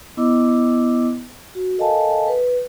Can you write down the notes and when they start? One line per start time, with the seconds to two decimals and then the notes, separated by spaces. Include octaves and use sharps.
0.17 B3 E4 D#5 D6 E6
1.55 F#4
1.78 A4 A#4 D#5 F5 G#5 A5
2.28 B4